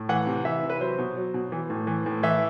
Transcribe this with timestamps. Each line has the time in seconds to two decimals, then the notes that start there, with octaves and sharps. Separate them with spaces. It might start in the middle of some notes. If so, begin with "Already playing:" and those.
Already playing: A2
0.09 E3 F#5
0.27 C3
0.45 E3 E5
0.63 C3
0.70 B4
0.80 F#3 C5
0.98 B2
1.16 F#3
1.34 B2
1.52 E3
1.70 A2
1.87 E3
2.06 A2
2.23 E3 E5